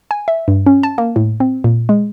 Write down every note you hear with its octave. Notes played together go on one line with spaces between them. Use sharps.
G#5
E5
G2
C#4
A5
A#3
A2
C4
A#2
G#3